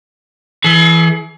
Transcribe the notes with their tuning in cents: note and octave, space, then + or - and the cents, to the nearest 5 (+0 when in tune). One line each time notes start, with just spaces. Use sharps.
E3 +0 G#4 +40